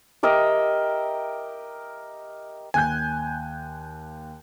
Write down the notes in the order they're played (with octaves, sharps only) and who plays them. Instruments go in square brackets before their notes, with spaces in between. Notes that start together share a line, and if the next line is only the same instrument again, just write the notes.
[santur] G4 A#4 D#5 E5
[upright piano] D#2 F#6 G6 [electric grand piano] G#5